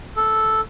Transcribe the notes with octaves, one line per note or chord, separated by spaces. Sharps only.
A4